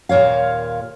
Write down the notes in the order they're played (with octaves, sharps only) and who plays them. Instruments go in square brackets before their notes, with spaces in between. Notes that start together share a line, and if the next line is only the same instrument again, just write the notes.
[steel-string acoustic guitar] D#2 A#2 A#4 C#5 F5